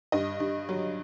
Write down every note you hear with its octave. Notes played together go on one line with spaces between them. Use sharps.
G2 D#5
G2
F#3